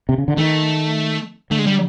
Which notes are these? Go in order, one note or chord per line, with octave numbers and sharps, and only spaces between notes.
C3
C#3
D3
D#3 A3
D3 A3
G#3
G3